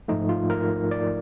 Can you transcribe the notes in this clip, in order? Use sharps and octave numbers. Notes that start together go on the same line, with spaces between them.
G#2 F3 A3 D#4
F4
A#4
D5